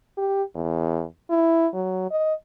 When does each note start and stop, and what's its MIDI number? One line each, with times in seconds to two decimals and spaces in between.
0.18 0.43 67
0.55 1.04 40
1.30 1.67 64
1.74 2.07 54
2.11 2.34 75